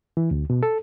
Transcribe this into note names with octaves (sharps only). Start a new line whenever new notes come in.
E3
D2
B2
A4